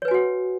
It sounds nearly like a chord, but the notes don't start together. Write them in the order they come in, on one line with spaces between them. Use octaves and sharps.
C#5 B4 G#5 F#4 F#5